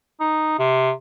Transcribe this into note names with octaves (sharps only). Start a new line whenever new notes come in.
D#4
C3